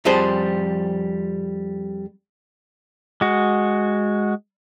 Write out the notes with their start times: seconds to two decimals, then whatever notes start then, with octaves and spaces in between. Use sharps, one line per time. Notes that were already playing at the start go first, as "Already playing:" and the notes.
0.05 F2 F3 G3 G#4 C5
3.21 G#3 F#4